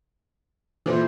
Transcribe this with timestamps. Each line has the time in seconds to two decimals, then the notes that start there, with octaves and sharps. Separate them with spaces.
0.86 A#2 E3 E4 A4 C5